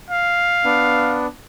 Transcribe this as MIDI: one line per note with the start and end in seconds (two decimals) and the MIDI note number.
0.11 1.19 77
0.65 1.27 59
0.65 1.27 62